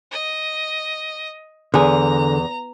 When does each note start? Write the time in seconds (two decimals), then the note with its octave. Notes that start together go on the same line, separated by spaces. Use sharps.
0.12 D#5
1.74 E2 D3 G#4 A#5